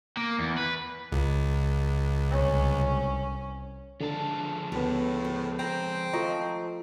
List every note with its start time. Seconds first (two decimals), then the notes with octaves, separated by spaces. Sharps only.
0.17 A#3
0.38 E2
0.58 B4
1.12 C#2
2.30 C2 C#4
4.01 D3 F3 G#3 A5
4.72 D2 A2 B3 B4
5.25 C5
5.59 C4 G5 A#5
6.13 F3 A3 D#5 A#5 C#6